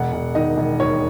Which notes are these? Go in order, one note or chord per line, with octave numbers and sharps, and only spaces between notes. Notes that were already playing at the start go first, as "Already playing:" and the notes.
Already playing: E1 F#5
E1
D#3 D#5
E1
D#2 C#5